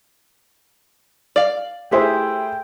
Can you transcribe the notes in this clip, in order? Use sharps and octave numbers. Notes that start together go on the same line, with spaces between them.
D5 F5
A3 E4 G4 G#4 B4 C5 G5